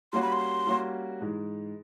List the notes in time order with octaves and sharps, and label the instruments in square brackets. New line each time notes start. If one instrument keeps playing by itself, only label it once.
[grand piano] G3 A#3 C#4 F#4 [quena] C6
[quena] B5
C6
[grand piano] G3 A#3 C#4 F#4
G#2 E3 G#3